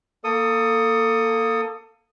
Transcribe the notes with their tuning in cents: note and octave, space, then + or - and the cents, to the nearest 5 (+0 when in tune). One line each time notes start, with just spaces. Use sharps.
A#3 +0 A4 +25 D#6 +0